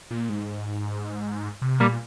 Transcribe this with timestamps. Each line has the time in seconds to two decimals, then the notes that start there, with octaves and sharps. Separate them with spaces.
0.11 A#2
0.29 G#2
1.62 C3
1.80 A#2 G3 A#3